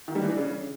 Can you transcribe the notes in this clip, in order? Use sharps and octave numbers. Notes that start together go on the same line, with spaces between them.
D#3
G3
E3
D4
C#3